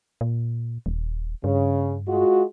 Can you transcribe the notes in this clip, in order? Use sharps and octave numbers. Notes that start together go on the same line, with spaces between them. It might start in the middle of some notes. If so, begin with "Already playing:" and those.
A#2
D#1
G2 C#3
G#3 F4 F#4